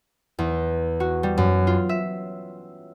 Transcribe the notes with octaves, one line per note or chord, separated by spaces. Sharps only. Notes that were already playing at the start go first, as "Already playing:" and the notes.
E2
F#4
G3
F#2
F4
E5